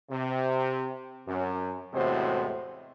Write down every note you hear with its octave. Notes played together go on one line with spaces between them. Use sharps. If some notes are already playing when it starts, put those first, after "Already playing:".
C3
F#2
E2 A2 C3 G#3 F#4 C5